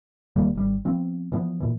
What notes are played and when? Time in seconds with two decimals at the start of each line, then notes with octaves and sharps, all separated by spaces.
0.36 D#1 D#3 G3 A#3
0.55 G#1 G3
0.85 F3 B3 C4
1.32 E3 F3 B3
1.60 A#2 E3